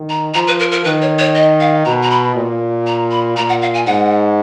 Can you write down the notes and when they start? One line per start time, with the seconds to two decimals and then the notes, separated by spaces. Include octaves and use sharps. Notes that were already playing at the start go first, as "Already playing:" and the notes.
Already playing: D#3
0.09 A#5
0.34 F3 A#5
0.47 B4
0.60 A#4
0.72 A#4
0.85 D#3 B4
1.02 C#5
1.19 C#5
1.35 D#5
1.60 F5
1.85 B2 A#5
2.02 A#5
2.10 B5
2.35 A#2
2.87 A#5
3.11 B5
3.36 A#2 A#5
3.49 F#5
3.62 F5
3.74 G#5
3.86 G#2 F#5